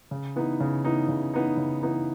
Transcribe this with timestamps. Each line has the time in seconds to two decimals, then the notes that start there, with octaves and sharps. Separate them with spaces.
0.11 C#3
0.36 E3 B3 D#4
0.60 C#3
0.85 E3 B3 D#4
1.09 C#3
1.33 E3 B3 D#4
1.57 C#3
1.83 E3 B3 D#4